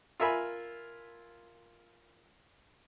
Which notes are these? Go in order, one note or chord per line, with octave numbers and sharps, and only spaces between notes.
F4 A#4 E5 G#5 B5